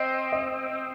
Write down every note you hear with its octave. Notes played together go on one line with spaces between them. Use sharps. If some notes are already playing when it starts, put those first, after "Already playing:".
Already playing: C4 D#5
D#5